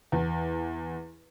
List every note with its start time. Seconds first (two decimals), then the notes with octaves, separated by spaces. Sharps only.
0.12 E2